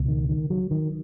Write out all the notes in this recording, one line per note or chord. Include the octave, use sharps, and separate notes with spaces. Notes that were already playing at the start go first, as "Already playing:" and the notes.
Already playing: C#2 B2
D#3
D#3
F#3
D#3